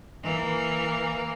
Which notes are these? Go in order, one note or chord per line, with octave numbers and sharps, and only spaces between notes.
E3 A#3